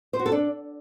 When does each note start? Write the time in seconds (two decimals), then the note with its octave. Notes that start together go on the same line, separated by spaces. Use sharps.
0.13 C5
0.19 F#4
0.26 A4
0.32 D4